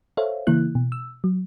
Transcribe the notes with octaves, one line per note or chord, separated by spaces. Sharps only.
A4 C5 C#5 E5 F5
C#3 E3 A#3 E4 F#6
B2
E6
F#3